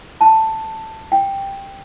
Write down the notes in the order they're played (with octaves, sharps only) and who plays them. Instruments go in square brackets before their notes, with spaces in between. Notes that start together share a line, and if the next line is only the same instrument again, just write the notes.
[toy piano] A5
G5